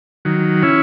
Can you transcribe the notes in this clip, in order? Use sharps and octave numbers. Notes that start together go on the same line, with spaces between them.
D#3 F#3
C#4 E4